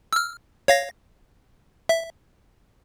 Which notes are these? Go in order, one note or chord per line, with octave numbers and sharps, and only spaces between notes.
E6 F6
C#5 F5 A#6
E5